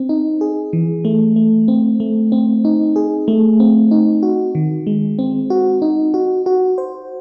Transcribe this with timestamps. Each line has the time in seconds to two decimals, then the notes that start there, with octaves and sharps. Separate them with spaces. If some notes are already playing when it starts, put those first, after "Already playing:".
Already playing: C4
0.09 D#4
0.41 G#4
0.73 E3
1.05 A3
1.36 A3
1.68 C4
2.00 A3
2.32 C4
2.65 D#4
2.96 G#4
3.28 A3
3.60 C4
3.91 D#4
4.23 F#4
4.55 D#3
4.87 G#3
5.19 C4
5.50 F#4
5.82 D#4
6.14 F#4
6.46 F#4
6.78 C5